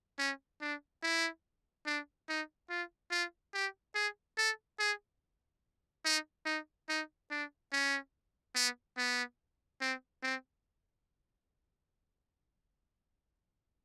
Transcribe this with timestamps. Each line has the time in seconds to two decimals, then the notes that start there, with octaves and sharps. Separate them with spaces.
0.18 C#4
0.61 D4
1.03 E4
1.86 D4
2.28 D#4
2.69 F4
3.11 F4
3.54 G4
3.95 G#4
4.37 A4
4.79 G#4
6.05 D#4
6.46 D#4
6.89 D#4
7.30 D4
7.72 C#4
8.55 B3
8.97 B3
9.81 C4
10.23 C4